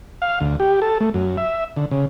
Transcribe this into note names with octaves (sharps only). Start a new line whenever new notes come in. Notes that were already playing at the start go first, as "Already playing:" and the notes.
F5
D2
G4
A4
A3
F#2
E5
D3
C#3